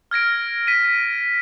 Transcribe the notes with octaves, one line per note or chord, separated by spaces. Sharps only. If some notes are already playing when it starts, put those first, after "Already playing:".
F6 G#6 A#6 D7
B6 D#7